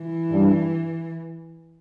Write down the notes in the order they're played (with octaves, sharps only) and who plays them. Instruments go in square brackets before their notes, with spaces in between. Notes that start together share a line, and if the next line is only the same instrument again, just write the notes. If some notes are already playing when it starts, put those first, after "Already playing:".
Already playing: [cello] E3
[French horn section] G2